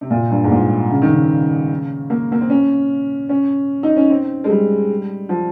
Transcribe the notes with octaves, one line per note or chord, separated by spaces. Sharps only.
C3
A#2
G2
G#2
A#2
C#3
D#3
C#3
A#3
A#3
C4
C#4
C#4
D#4
C#4
C4
G#3
G3
F3